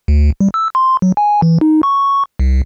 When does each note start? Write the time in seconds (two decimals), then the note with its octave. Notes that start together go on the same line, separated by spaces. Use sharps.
0.08 D2
0.40 G3
0.54 E6
0.75 C6
1.02 F#3
1.17 G#5
1.42 E3
1.61 D#4
1.83 C#6
2.39 C2